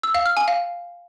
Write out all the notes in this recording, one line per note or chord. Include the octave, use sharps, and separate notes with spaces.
E6
F5
F6
G#5
F5